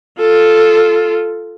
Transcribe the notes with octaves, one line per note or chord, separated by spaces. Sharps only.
F4 A4